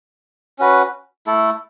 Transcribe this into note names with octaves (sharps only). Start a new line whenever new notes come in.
C#4 F#4 B4
A3 E4 A4